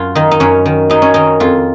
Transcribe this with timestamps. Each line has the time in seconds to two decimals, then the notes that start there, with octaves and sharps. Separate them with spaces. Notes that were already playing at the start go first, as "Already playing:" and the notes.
Already playing: F#2 F4
0.15 D#3 D#4
0.31 D#4
0.40 F#2 C#4
0.66 D#3
0.90 F#2 D#4
1.02 C#4
1.14 D#3 D#4
1.40 F2 F4